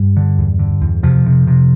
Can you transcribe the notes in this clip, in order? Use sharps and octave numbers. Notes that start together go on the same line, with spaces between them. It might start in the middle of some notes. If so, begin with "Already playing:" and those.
Already playing: G2 G3
D3
E2
D3
E2
F2 C3 F3
C3
C3